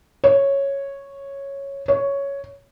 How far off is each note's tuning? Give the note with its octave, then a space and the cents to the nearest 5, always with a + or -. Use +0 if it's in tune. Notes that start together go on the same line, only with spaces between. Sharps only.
C#5 -5
C#5 +5